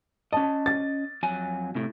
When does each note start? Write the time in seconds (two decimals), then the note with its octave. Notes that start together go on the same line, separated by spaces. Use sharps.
0.33 C#4 D#5 A5
0.66 A6
1.23 F2 F#3 G#5
1.75 A2 C3